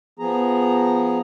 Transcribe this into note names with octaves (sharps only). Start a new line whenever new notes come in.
F3 B3 G#4 A#5